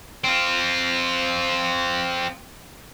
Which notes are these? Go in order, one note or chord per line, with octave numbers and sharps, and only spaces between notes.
C4 F4